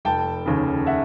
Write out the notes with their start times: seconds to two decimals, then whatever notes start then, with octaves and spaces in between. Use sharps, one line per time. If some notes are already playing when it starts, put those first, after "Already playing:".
0.05 F1 G5 A5
0.46 D#2 C#3
0.86 E5 F#5